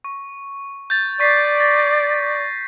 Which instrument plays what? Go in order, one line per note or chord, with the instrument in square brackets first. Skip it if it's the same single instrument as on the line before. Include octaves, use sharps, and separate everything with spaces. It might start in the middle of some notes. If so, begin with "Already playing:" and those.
[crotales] C#6
G6 A6
[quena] D5 [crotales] C#6 B6 C7
[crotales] A6 A#6